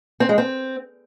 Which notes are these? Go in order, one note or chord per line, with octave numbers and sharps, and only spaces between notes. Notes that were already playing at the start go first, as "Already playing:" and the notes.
C4
G#3
C4